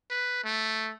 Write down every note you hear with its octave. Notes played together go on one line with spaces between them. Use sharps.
B4
A3